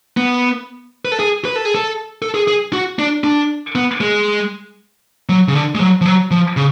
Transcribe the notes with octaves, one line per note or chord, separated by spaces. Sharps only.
B3
B4
A4
G#4
B4
A4
G#4
A4
A4
G#4
G#4
F#4
D4
D4
B3
G#3
F#3
C#3
D3
G#3
F#3
F3
F#3
F3
C#3